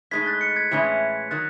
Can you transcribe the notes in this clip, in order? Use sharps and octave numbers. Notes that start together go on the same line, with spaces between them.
A2 G#3 D#4 G#6 B6
F#6 A6
A6 C#7
G#6 B6
A2 E3 G#3 C#4 E4
D#3 F#3 F#6 A6